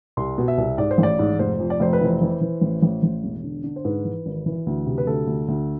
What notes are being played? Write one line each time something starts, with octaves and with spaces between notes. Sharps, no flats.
C2 C6
B2
E5
C2
G#2 D5
C5
A1
D5
G#2
F1 C5
F2
D5
F1 C5
B4
E3 C5
E3
E3
A1
A1
A1
E1
D3
D3
C5
G#2 B4
E3
G#1
E3
D2
C3
B4
D2 A4
D2
D2